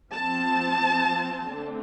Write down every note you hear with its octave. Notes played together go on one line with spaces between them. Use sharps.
F3 C4 A5
D3 A3 C4